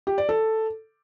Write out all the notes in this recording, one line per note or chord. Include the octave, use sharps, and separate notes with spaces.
G4
D5
A4